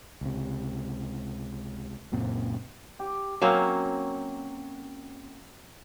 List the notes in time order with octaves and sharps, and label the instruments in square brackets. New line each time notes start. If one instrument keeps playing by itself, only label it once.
[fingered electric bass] C#2 C3
C#2 F#2 A#2 C4
[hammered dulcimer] G4
[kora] F#3 A#3 C4 C#4